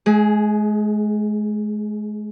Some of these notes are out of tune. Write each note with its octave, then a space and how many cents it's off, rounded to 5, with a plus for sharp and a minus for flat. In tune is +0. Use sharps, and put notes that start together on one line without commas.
G#3 +35 G#4 +0